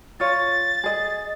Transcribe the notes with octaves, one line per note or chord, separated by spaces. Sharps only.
F4 C#5 A6
G#4 D#5